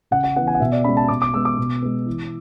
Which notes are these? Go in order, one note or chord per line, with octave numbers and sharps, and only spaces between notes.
C#3 F#5
F#5
E3 B3 F#5
G#5
F#5
B2 E5
D5
G#3 C#4 B5
A5
B2 D6
D6
G#3 B3 E6
D6
B2
G#3 B3
E3